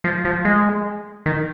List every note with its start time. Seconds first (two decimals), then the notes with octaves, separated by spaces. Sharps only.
0.04 F3
0.25 F3
0.45 G#3
1.26 D#3